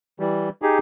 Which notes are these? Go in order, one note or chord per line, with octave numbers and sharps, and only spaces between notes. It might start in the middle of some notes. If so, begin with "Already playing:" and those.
E3 G3
D#4 G4 G#4